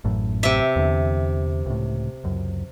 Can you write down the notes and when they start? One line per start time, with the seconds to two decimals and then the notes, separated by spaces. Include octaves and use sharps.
0.04 A1 F#2 A2
0.43 C3 E5
0.76 E2 D3
1.66 C#2 A2
2.24 C#2 F#2